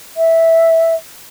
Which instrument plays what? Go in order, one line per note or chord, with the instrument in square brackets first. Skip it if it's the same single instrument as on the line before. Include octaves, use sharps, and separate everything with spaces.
[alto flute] E5